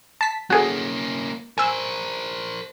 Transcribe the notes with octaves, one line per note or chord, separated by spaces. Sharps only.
A5 B6
A#3 C#4 F#4 G#4 A4
A#4 C5 G#5 E6